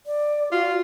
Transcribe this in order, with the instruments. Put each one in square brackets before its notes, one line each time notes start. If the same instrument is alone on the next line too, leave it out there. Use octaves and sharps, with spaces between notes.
[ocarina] D5
[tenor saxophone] F4 [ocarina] F#4